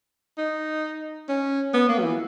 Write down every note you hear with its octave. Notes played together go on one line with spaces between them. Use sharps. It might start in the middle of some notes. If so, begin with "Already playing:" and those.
D#4
C#4
B3
A#3
F#3
E3